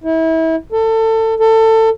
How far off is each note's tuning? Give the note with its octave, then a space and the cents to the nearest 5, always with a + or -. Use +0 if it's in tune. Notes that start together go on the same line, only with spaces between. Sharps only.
E4 -30
A4 +25
A4 +25